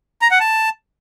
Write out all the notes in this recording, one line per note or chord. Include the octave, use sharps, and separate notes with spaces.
A#5
F#5
A5